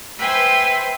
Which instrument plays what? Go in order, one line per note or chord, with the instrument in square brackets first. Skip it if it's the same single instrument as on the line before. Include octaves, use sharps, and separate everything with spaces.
[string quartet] B4 C5 E5 G5 G#5 C6